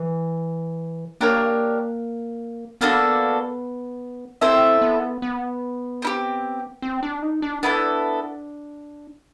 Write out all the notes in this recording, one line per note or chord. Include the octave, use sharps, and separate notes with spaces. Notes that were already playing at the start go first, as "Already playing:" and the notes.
Already playing: E3
A#3 D4 G4 A#4 C#5
A#3 B3 D4 F#4 A4
C4 E4 A4 C5 E5
B3
B3
C4 E4 G4
C4
D4
D#4
D4
B3 D4 E4 A4